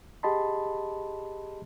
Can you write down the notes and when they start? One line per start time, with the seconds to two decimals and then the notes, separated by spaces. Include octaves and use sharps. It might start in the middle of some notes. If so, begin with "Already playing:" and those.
0.23 G4 G#4 D#5 A5 B5 C6